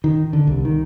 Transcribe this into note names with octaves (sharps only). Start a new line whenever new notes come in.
D#3
D3
C2
D#3